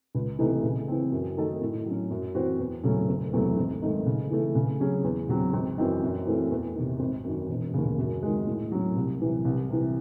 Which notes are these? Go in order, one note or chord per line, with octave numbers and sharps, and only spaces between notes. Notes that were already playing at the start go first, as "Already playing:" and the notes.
C#2
C3 E3 A3 D#4
C#3
E3 C4
F#2
D#3 A3 D#4 A4
A2
F#3 C#4
F#2
E3 C4 F#4 C5
E2
C#3 F#3 A3 C#4
F#1
E2 C3 F#3 A3
G#1
G#2 D#3 A3 D#4
C#3
E3 A3
C#3
F#3 C#4 G#4
E2
C#3 F#3 C4
G#1
F#2 E3 C4 D#4
F#2
E3 A3 C4
E2
C3 D#3
G#1
F#2 D#3
E1
D#2 C#3
F#2
D#3 G#3
A2
F#3 C#4
C2
C3 E3
C2
C3 E3